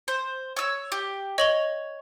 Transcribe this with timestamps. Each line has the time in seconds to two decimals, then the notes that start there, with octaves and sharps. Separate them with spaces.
0.08 C5
0.57 C#5 E6
0.92 G4
1.38 C#5 D#5 F#7 G7